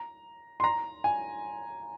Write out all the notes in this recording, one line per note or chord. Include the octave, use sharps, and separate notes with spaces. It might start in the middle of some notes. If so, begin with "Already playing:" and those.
Already playing: A#5
C6
A#5
G#5